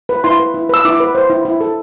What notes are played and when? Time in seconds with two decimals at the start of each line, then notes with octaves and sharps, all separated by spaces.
0.09 B4
0.24 E4 C6
0.40 B4
0.54 E4
0.69 B4 E6
0.85 E4 D6
1.00 B4
1.15 C5
1.30 E4
1.45 E4
1.61 A4